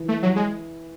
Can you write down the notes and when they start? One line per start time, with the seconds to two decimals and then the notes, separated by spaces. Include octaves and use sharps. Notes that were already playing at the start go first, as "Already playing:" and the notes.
Already playing: E3
0.09 A3
0.23 F#3
0.36 G#3